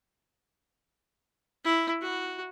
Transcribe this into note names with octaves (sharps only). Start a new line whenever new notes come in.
E4
F#4